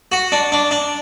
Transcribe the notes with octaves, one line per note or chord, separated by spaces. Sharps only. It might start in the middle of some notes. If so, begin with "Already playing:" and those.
F#4
D4
D4
D4